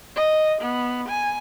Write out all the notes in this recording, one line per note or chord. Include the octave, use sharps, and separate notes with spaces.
D#5
B3
G#5